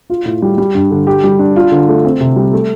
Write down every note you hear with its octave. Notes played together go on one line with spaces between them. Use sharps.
F4
A2
G3
G3
G2
D3
G4
G3
D4
F4
D3
A3
C4
C3
G3
A3